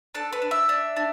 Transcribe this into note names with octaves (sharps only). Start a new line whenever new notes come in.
D4 A4
B4
D4
E5
D4
D4